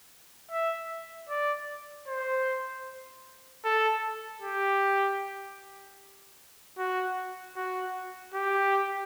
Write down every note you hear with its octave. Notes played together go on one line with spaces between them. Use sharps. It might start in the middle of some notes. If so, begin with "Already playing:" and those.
E5
D5
C5
A4
G4
F#4
F#4
G4